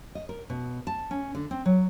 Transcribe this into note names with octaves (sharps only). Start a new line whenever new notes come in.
D#5
A#4
B2
A5
C#4
D3
C4
F#3